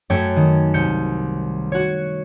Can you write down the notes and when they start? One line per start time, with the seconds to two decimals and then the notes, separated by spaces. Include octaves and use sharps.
0.10 F#2 A3 C#5 G5
0.36 D#3
0.74 C2 G6 C#7
1.72 F#4 C#5